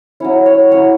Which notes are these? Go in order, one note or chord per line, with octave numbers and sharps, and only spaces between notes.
F#3 C#4 E4 C#5
C#5
F#3 C#4 E4 C#5